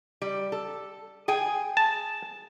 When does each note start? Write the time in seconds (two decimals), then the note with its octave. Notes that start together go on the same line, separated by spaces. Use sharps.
0.22 G3
0.52 A4
1.28 G#4 G5 G#5
1.77 A5